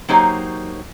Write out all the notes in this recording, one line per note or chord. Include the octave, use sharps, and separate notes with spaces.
F#3 A#3 D#4 G4 C5 C#5